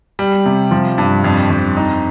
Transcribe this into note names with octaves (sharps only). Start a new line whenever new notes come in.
G3
C3
F3
G2
F2
F2
D#4